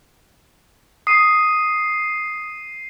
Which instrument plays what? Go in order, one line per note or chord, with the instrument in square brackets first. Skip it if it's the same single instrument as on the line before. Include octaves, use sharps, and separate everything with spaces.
[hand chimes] D#6 [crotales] C7 D#7